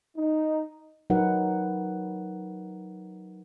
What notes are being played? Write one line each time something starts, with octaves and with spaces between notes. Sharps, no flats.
D#4
F#3 D#4 A#4 B4 F#5